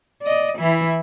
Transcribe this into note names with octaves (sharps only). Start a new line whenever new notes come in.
D5 D#5
E3 E4